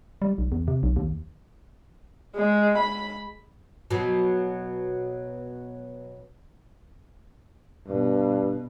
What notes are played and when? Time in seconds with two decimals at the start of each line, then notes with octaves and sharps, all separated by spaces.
0.22 G3
0.38 B1
0.52 E2
0.68 C3
0.83 B1
0.96 D#2
2.36 G#3
2.78 B5
3.91 B2 F#3
7.88 G2 B2